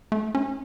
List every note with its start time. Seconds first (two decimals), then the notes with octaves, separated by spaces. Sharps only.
0.12 A3
0.35 C#4